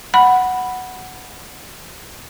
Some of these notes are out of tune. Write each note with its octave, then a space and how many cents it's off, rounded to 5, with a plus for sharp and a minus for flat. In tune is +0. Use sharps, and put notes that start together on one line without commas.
F#5 +0 B5 +0